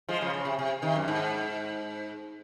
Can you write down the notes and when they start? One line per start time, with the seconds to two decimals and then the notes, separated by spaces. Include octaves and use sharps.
0.09 F3 G#3
0.21 C#3 F3
0.34 C#3
0.45 C3
0.59 C3
0.82 C3 D#3
0.96 F#2
1.08 G#2